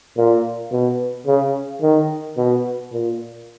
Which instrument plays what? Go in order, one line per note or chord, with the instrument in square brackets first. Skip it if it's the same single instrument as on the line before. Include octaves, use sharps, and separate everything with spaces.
[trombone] A#2
B2
C#3
D#3
B2
A#2